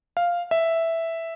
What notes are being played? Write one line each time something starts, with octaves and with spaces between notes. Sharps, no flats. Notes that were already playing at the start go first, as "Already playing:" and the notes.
F5
E5